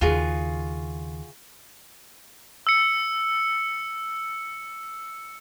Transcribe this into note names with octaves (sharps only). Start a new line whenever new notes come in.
D#2 C#3 F4 F#4 G#4
E6 C#7